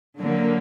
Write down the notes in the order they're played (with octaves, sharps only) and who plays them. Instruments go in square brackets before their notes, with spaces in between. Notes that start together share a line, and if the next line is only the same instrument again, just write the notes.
[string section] D3 F#3 A#3